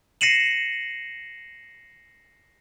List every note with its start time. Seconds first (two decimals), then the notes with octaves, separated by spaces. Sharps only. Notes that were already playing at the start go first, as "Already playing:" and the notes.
0.21 A#6 C7 C#7 D#7 E7 F#7